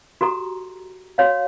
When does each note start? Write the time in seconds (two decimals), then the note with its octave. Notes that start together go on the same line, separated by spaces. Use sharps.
0.21 F#4 G4 A4 A#5
1.18 F#4 C#5 F5